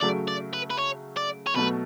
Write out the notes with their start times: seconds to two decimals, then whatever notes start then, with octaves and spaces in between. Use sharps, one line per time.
0.01 C#3 F#3 A3 D5
0.28 D5
0.53 B4
0.70 B4
0.78 C#5
1.17 D5
1.47 C#5
1.55 B2 F#3 A3 B4